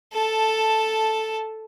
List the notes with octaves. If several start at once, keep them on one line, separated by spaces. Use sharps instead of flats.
A4 A5